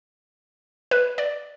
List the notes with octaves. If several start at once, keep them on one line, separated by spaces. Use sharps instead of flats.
B4
D5